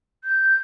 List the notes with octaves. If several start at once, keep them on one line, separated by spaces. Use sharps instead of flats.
G6